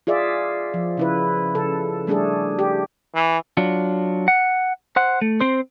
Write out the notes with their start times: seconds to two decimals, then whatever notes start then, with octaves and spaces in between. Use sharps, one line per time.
0.07 F4 G#4 D5 E5
0.74 F3
0.97 C#3 E4 B4
1.55 C#3 A4
2.07 G3 A3 D4 G#4 A4
2.59 G4
3.15 E3
3.57 F#3 D4 F4
4.28 F#5
4.96 C5 F#5
5.22 A3
5.41 C4 C5